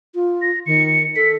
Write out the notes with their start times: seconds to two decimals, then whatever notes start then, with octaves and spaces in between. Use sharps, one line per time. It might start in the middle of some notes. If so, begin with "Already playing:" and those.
0.15 F4
0.42 A#6
0.66 D#3 C#7
1.16 A4 B6